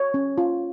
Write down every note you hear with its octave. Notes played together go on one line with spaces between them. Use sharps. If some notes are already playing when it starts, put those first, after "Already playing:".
Already playing: C#5
C#4
F4